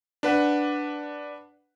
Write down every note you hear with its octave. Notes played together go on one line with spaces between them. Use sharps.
D4 B4 F#5